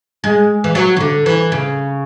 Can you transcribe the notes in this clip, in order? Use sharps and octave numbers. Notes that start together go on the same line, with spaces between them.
G#3
E3
F#3
E3
D3
E3
C#3